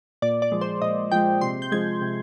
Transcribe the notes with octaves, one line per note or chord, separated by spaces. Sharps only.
A#2 D5
D5
F3 G#3
C5
A#2 D#5
F3 G#3 G5
C3 C6
G6
F3 G#3 G#6
C3